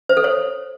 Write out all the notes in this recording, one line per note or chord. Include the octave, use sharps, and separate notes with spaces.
C5
A4
C#5